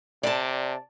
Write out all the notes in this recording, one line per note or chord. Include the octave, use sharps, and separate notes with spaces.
C3 D5 A5